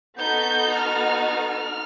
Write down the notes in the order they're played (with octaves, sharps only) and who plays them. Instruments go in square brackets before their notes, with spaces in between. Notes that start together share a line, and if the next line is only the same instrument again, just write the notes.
[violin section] B3 D#4 F#4 A4 G6
F6
F6